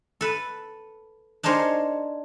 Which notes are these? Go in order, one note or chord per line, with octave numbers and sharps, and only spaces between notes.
A4 B4
D4 D#4 G#4 A#4 C5 C#5